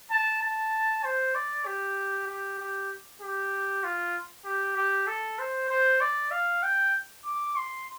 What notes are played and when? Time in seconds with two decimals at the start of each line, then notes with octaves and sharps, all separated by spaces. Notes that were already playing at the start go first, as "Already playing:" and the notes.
0.10 A5
0.42 A5
1.04 C5
1.35 D5
1.66 G4
2.27 G4
2.59 G4
3.21 G4
3.84 F4
4.45 G4
4.76 G4
5.07 A4
5.39 C5
5.69 C5
6.00 D5
6.31 F5
6.63 G5
7.25 D6
7.56 C6